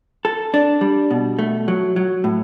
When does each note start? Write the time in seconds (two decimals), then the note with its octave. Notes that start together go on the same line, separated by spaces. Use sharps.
0.25 A4
0.54 D4
0.81 G3
1.11 B2
1.39 A3
1.68 F#3
1.96 F#3
2.24 A2